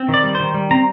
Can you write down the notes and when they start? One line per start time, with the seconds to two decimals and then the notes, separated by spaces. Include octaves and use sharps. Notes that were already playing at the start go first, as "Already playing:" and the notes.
Already playing: C4
0.09 D#3
0.14 D5
0.24 G3
0.35 C5
0.40 D#3
0.54 G3
0.71 C4 A#5